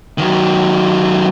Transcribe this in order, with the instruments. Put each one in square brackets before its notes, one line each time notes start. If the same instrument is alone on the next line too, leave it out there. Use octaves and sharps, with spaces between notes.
[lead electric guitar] D#3 F#3